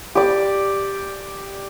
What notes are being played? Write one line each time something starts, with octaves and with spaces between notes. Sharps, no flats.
G4 D5